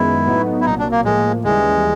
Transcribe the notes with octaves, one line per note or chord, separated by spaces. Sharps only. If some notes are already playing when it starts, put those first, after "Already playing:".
Already playing: F#2 D#3 G#3 B3 E4
A2 F#3 B3 D#4 F#4
E4
C2 A#2 F#3 D#4
D4
A#3
A2 F3 G#3 A#3
D#2 C#3 E3 G3 G#3